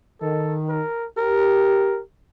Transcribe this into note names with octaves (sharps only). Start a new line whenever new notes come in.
D#3 A4
A#4
G4 A#4